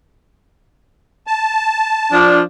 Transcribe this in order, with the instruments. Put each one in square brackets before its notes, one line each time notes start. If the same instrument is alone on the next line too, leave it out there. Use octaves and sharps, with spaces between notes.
[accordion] A5
[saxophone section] F3 D4